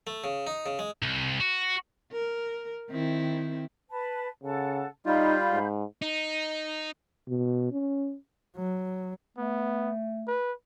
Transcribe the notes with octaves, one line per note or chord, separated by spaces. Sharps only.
A3
C#3
D#4
C#3
G#3
C2
F#4
A#4
D#3 C4 E4
B4 A5
C#3 A4 F#5 A5
G3 D#4 F4 F5 B5 G6
G#2
D#4
B2
C#4
F#3
A3 B3
B4